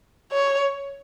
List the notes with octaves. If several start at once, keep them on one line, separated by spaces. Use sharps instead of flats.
C#5